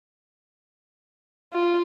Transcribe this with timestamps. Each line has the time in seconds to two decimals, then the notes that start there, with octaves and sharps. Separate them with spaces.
1.54 F4